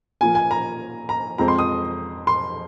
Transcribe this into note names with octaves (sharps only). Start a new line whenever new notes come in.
A#2 F3 A#3 G#5
G#5
A#5
A#5
F2 F3 G#3 C4 A#5
C6
D#6
C6